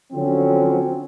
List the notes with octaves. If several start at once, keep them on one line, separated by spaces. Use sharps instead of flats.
D3 F3 F#3 C4 C#4